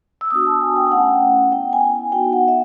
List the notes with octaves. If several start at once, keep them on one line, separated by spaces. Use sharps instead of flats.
E6
B3 D4 F#4 D#6
A5
G#5
G5
G5
A3 C#4 E4 F#5
B3 E4 G5
G#5
B3 D#4 F#4 G5
F#5
E5